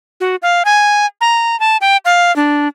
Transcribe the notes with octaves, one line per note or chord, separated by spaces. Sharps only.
F#4
F5
G#5
A#5
A5
G5
F5
D4